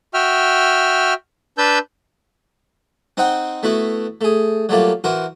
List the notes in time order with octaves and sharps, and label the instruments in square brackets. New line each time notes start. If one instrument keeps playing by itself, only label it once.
[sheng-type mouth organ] F#4 E5 G5 F6
D4 B4 A5 E6 G6
[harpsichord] C4 D#4 C5 F#5 G5
A3 B3 E4 F#4
A3 G#4
F#3 G3 A3 A#3 F4
E3 F#4 A#4 C5